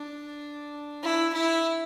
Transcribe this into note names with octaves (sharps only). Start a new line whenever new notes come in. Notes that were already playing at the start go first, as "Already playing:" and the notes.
Already playing: D4
E4
E4